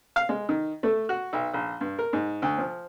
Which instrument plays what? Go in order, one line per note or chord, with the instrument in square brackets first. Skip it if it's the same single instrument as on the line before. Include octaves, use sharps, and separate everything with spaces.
[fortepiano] F5
G#3
D#3
A3
F#4
B1
A#1
G2
A#4
G#2
D2
F3